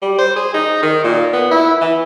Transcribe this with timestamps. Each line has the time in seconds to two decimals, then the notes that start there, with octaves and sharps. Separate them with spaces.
0.02 G3
0.18 C5
0.36 G#4
0.54 D#4
0.82 D#3
1.04 A#2
1.33 B3
1.51 E4
1.81 E3